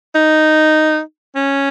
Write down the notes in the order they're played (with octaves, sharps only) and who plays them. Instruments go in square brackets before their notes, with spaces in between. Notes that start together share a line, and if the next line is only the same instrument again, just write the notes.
[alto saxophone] D#4
C#4